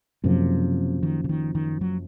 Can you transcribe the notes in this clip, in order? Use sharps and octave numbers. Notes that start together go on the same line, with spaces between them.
F#1 F#2 C3 F3
D#3
C#3
D#3
D#3
F#3